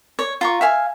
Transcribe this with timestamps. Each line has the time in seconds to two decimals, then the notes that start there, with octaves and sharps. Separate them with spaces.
0.19 C#5
0.41 F4 A#5 C#6
0.61 E5 F5 G#5